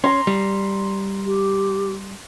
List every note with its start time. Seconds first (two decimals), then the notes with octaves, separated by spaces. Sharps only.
0.04 C#4 A#5 C6
0.27 G3
1.26 G4